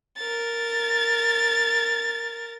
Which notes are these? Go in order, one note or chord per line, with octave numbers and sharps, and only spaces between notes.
A#4 A6